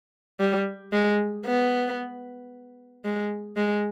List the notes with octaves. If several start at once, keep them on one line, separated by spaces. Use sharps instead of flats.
G3
G#3
B3
G#3
G#3